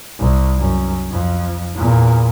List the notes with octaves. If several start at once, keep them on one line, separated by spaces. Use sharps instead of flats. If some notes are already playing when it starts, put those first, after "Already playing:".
C2
F#2
F2
E2 A#2